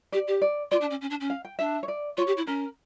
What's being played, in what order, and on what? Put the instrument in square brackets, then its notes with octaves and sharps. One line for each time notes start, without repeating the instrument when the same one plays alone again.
[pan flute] G4 [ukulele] D5
[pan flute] G4
[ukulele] D5
[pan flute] F4 [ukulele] D5
[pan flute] D4
C#4
C#4
D4
C#4
[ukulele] F5
G5
[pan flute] D4 [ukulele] E5
[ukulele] C#5
D5
[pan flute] F4 [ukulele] C#5
[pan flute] G4
E4
[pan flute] C#4 [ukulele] A#4